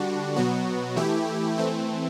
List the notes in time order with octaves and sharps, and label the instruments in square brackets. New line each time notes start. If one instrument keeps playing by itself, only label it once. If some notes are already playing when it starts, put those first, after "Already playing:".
Already playing: [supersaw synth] D3 G3 D4 F#4
B2 F#3 B3 F#4
E3 A3 E4 G4
E3 A3 C4